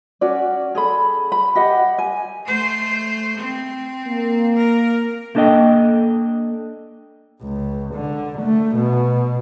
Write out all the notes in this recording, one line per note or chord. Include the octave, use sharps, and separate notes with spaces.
C#4 F#4 D5
G#4 A4 B5
B5
G4 D#5 F#5
G#5
A3 C5
C4
A#3
A#4
A3 A#3 D4 A4 D#5 G5
C#2
D3
A3
B2